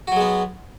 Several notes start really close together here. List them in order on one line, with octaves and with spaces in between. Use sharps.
F#4 F#3 G#3 B3